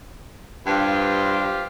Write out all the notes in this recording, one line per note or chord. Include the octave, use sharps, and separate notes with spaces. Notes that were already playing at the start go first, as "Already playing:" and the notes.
G2 F4 G4 C5